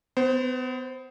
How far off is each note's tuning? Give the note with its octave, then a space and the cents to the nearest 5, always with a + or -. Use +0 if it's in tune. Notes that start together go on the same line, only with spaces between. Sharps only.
B3 +35 C5 +0